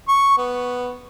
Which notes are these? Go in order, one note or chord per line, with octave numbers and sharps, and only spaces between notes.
C#6
B3